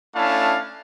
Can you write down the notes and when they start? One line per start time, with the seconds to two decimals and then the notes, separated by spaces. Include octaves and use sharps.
0.15 A3 C#4 D4 E4 F5 A5